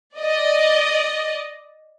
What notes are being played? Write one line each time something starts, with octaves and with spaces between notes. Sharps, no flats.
D5 D#5